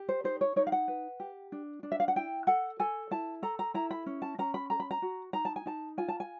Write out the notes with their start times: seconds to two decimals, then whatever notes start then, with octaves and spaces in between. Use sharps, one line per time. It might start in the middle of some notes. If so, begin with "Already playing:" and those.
Already playing: G4
0.09 C5
0.24 D#4 C5
0.41 C#5
0.56 D#4 C#5
0.67 F5
0.72 F#5
0.88 B4
1.20 G4
1.52 D4
1.83 D4
1.92 E5
2.00 F5
2.08 F#5
2.16 E4 G5
2.47 A4 F#5
2.80 A4 G#5
3.11 E4 A5
3.42 A4 A#5
3.59 A#5
3.74 E4 A#5
3.91 B5
4.06 C#4
4.22 A5
4.39 C#4 A#5
4.54 B5
4.70 A4 A#5
4.80 B5
4.91 A#5
5.02 F#4
5.33 D#4 A#5
5.45 A5
5.56 G#5
5.66 D#4 A5
5.98 F4 G#5
6.08 A5
6.20 G#5